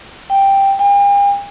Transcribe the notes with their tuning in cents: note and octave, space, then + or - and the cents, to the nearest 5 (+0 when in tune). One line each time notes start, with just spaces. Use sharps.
G5 +5
G5 +45